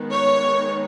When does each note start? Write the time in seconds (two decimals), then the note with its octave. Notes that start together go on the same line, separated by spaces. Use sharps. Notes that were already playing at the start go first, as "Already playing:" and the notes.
Already playing: D#3 G#3 B3
0.11 C#5